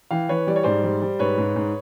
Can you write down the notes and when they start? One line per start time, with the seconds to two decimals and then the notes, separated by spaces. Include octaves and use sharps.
0.11 E3 F5 G5
0.29 E3 B4 C#5
0.47 G3 D5
0.56 C#5
0.63 G#2 C5 D5
0.84 G3
1.02 G3
1.19 G#2 B4 C#5
1.38 G#2
1.56 G#2